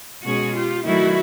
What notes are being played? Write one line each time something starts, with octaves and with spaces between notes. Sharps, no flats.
B2 G#3 C#4 F#4 G#4
F4 G4
D#3 F#3 A3 E4 F#4